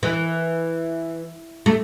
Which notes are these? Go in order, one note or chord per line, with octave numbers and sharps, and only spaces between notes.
E3
A3